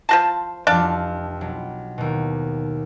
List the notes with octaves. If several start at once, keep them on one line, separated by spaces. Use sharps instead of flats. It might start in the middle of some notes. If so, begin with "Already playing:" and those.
F3 F#4 C5 A5
F1 F2 D4 F5
B1
D#2 B2